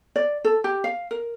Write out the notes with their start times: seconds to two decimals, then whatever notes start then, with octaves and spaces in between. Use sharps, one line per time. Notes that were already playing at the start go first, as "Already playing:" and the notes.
0.16 D5
0.45 A4
0.64 G4
0.84 F5
1.11 A#4